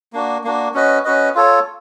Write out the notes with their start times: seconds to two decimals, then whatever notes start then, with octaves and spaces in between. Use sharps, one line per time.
0.13 A#3 D4 F#4
0.44 A#3 D4 F#4
0.74 C#4 F#4 B4 D#5
1.05 C#4 F#4 B4 D#5
1.35 F4 A4 C#5